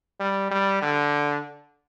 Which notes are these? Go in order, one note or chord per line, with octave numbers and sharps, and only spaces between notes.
G3
G3
D3